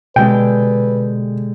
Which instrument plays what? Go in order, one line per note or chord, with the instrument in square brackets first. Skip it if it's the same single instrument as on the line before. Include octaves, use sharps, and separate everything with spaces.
[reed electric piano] B2 [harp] D3 G#3 G4 [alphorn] B4 [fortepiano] G5